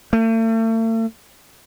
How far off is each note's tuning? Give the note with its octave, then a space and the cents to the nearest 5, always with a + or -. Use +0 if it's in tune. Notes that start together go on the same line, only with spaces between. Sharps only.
A3 +40